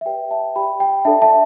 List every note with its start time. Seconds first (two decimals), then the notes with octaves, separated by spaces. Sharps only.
0.01 E5
0.06 G4 B4 D5 G5
0.31 E5 A5
0.55 G4 D5 G5 B5
0.80 G5
1.05 D4 A4 D5 E5 A5
1.22 E5 A5